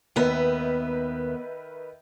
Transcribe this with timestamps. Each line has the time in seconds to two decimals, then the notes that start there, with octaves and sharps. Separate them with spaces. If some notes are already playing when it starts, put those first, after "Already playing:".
0.16 D#2 D#3 B3 B4 E5